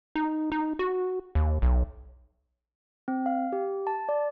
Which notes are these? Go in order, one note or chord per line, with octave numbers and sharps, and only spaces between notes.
D#4
D#4
F#4
D#2
B1
C4
F5
G4
A5
D5